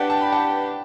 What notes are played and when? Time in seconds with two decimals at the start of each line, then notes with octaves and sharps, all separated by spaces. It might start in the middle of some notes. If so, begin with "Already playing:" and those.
Already playing: D4 G4 B4 D5 F#5
0.10 A5
0.21 B5
0.32 F#5 A5